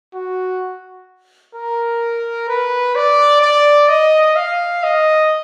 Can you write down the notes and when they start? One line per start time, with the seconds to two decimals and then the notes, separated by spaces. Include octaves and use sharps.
0.14 F#4
1.55 A#4
2.49 B4
2.95 D5
3.41 D5
3.89 D#5
4.36 F5
4.83 D#5